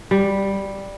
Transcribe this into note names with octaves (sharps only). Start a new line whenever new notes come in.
G3